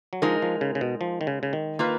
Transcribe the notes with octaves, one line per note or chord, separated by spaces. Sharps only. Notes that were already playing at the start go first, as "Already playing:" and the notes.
F#3
F3 G#3 D#4 A#4
F3
C#3
C#3
B2
F3
D#3
C#3
C#3
D#3
A#3 F4 B4